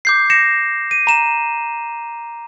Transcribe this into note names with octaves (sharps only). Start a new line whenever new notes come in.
D6 G6 C7
A#6 C#7 E7
D#7
A#5 E7